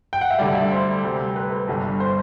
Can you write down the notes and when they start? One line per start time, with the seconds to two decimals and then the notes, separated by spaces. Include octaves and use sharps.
0.13 G5
0.21 F#5
0.31 E5
0.39 D2 D3 G3 D5
0.55 E5
0.71 C5
1.04 D2 C3 G3
1.36 B4
1.68 G1 G2 D3 G3
2.00 C5